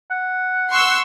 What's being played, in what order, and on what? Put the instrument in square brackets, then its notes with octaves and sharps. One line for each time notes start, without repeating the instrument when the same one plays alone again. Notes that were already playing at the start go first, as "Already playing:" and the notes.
[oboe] F#5
[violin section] C6 C#6 E6